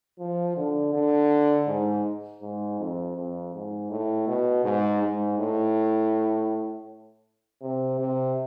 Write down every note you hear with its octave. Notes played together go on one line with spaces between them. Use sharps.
F3
D3
D3
G#2
G#2
F2
F2
G#2
A2
B2
G#2
G#2
A2
C3
C3